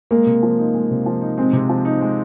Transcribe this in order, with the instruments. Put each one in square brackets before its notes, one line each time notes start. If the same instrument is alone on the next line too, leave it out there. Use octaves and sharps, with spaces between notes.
[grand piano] G#3 [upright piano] A#3
[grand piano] C3
F3
D#4
G#3
C3
F3
D#4
[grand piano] G#3 [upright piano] C4
[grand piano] C3
F3
D#4
G#3